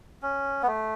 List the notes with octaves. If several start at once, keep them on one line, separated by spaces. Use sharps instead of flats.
C#4
B3
A3